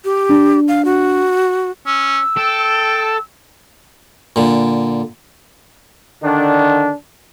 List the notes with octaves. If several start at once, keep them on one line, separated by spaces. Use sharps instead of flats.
G4
D4
F5
F#4
C#4 E6
A4 G5
A#2 D3
D3 D#3 D4